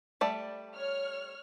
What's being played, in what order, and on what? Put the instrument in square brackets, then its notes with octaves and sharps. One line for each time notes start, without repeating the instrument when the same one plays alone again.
[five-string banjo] G3 A3 D5
[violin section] C#5 F6